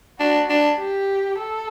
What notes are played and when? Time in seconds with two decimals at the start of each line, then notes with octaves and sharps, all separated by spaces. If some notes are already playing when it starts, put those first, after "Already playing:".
0.20 D4 F#4
0.50 D4
0.79 G4
1.39 A4